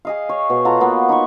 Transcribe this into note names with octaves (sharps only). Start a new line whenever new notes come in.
G#4 D#5 F5
C#5
B2
F4 F#4 A4 A#5
A#3 B3
D#4 B4 C#6